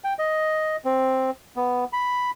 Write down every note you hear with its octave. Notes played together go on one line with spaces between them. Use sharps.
G5
D#5
C4
B3
B5